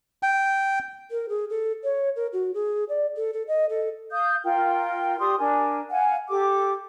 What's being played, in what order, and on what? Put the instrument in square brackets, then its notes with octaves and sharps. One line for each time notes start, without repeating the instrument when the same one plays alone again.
[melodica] G5
[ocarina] A#4
G#4
A4
C#5
A#4
F#4
G#4
D5
A4
A4
D#5
A4
[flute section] F5 D#6 G6
F4 A#4 G5
G4 D5 C6 D#6
D4 A#4 G#5
F5 F#5 G#5
G4 A4 D6